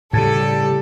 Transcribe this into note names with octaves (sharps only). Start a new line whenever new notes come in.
A2 C#3 G3 A4